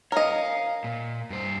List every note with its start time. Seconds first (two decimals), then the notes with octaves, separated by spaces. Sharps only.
0.12 A#4 C#5 D#5 F5
0.84 A#2
1.30 G2 C5